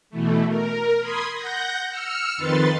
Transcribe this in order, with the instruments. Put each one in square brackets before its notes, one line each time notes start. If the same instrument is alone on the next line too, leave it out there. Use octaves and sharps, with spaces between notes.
[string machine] B2 E3 A3
A#4
B5 C6 D#6 G#6
F#5 G6 A#6
E6 F6 C#7
F2 D#3 B4 C6 A6